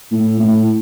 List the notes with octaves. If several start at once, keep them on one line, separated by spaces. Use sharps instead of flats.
A2
A2